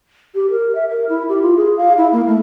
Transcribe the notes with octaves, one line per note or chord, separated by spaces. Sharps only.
G4
A#4
E5
A#4
E4
G4
F4
G#4
F5
E4
A#3
A3